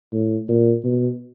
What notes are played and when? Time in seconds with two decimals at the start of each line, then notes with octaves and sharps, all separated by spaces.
0.12 A2
0.48 A#2
0.84 B2